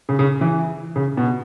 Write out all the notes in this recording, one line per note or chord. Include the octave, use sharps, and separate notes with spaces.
C#3
C#3
E3
C#3
B2